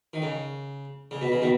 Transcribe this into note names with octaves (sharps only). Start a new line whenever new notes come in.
D#3
C#3
C#3
B2
C#3
B2 D#3